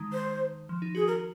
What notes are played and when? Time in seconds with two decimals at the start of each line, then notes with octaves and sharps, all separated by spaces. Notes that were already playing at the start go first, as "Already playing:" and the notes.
Already playing: D#3 G#3 D#4
0.13 C5
0.69 F3
0.82 D#4
0.95 F#4 G#4
1.07 A#4